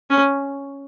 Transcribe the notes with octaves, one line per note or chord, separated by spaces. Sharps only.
C#4